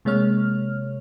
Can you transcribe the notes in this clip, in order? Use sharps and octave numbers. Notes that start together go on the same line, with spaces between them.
C3 G#3 A#3 C#5 F6